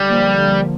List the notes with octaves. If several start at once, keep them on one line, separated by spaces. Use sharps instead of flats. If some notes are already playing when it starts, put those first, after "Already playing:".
Already playing: D3 G3
F3 A#3
D3